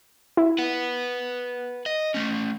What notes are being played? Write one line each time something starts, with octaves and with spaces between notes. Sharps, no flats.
E4
B4 F#5
D#5
A3 C#4